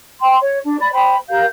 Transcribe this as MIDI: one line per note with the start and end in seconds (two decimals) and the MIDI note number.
0.20 0.36 79
0.20 0.36 84
0.40 0.57 73
0.65 0.77 62
0.79 0.88 74
0.79 0.88 83
0.92 1.15 72
0.92 1.15 79
0.92 1.15 83
1.29 1.44 67
1.29 1.44 70
1.29 1.44 77
1.29 1.44 91